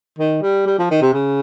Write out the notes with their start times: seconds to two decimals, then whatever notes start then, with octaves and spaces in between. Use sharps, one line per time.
0.19 D#3
0.42 G3
0.66 G3
0.79 F3
0.90 D#3
1.02 C3
1.14 C#3